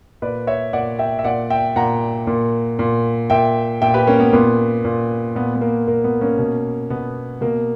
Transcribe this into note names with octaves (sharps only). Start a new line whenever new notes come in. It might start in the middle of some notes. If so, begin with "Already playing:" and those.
A#2 B4 D5
C#5 E5
A#2 D5 F#5
E5 G5
E5
A#2 D5 F#5
E5 G5
A#2 F#5 A#5
A#2
A#2
A#2 E5 G5
A#2 E5 G5
G4 B4
A#3 C#4
B3
A#2 B3
A#2
A#2 B3
B3
A#3
A#2 A#3
B3
A#3 C#4
B2
B2 B3
B2 A#3